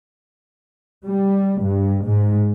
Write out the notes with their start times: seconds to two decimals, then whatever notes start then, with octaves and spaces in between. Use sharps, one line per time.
1.04 G3
1.61 G2
2.06 G#2